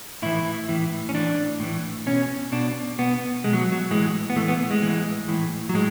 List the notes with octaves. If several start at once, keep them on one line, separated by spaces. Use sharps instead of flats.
A2 E3 E4
A2 E3
C#4
A2 E3 D4
A2 E3
B2 C#4
B2 D4
B2 B3
B2 G#3
F#3
F#3
A2 E3 G#3
B3
A2 E3 A3
B3
B3
G#3
A2 E3
A2 E3
F#3
A2 G#3